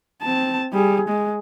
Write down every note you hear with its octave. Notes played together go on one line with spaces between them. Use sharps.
C4 A5
G3 G#4
G#3